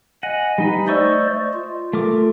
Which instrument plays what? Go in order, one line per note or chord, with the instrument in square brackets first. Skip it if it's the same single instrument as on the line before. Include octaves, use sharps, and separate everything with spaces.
[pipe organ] D#5 G#5 [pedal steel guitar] F#5
[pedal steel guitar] G3 D#4 B4
[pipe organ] A3 C5 D5 [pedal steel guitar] D#5 C#6 E6
[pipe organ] F4
[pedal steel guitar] A3 A#4 D6